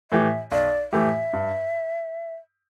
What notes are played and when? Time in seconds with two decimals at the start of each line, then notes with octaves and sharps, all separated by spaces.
0.11 A2 E3 A3 G4 E5
0.52 B1 D5
0.93 A2 E3 A3 G4 E5
1.33 G2